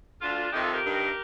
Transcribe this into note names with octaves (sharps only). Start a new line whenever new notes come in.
D2 D3 D4 F4
F2 C3 D#3 D#4 G4
F4 A4
G4 A#4
G2 D#3